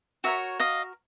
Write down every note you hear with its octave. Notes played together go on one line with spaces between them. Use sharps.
F#4 A#4 C#5 E5
D#5 F5